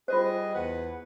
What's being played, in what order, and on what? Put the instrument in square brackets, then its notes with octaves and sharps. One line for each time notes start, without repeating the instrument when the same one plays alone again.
[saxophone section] G3 G#4 D#5 [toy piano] F4 C5
[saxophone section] E2 B4 F#5